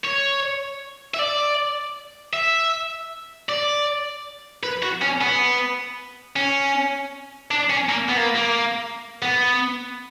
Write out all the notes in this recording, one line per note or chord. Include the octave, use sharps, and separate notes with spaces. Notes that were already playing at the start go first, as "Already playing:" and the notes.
C#5
E5
D5
E5
D5
B4
F#4
C#4
B3
C#4
D4
C#4
A#3
B3
A#3
A#3
B3